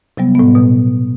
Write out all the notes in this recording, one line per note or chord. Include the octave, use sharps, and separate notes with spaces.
C3 F#3 G3 B3
A2 B3
B2